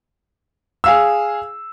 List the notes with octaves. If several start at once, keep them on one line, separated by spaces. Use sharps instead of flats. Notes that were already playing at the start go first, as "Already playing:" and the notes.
G#4 F5 E6